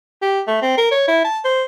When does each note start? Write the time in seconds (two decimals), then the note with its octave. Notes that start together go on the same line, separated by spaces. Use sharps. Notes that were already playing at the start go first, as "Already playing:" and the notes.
0.22 G4
0.47 A3
0.62 C4
0.77 A#4
0.91 C#5
1.08 E4
1.24 A5
1.44 C5